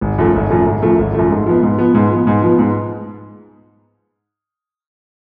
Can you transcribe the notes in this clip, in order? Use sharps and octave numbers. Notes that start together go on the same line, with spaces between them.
G#1
F#2 F3 A3
G#1
F#2 F3 A3
G#1
F#2 F3 A3
G#1
F#2 F3 A3
G#2
F3 B3
G#2
F3 B3
G#2
F3 B3
G#2
F3 B3
G#2